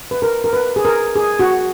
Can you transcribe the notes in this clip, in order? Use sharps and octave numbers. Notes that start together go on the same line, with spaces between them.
B4
A#4
A#4
B4
G#4
A#4
G#4
F#4